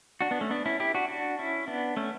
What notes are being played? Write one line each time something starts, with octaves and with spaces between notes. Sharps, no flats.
D4 F#4
B3 D4
A3 C#4
B3 D4
C#4 E4
E4 G4
D4 F#4
D4 F#4
C#4 E4
B3 D4
A3 C#4